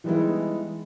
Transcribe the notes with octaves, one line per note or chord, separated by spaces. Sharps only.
E3 G3 G#3 B3 D#4 E4